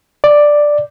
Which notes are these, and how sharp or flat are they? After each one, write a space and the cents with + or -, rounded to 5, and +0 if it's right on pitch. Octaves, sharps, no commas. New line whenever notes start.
D5 +5